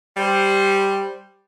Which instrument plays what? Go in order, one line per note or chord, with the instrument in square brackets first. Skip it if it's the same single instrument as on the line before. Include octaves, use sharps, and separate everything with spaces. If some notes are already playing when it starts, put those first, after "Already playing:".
[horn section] G3 C5